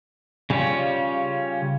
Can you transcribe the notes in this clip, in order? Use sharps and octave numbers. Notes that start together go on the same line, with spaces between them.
C#3 G3 C#4 F4